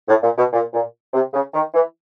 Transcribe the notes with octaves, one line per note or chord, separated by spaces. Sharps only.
A2
A#2
B2
A#2
A#2
C3
C#3
D#3
E3